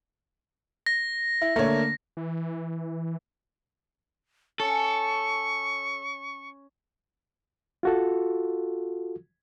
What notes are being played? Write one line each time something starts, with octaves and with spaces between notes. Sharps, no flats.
A#6
E4
D3 A3 A#3 C#5
E3
C#4 A4 C#6
F4 F#4 A4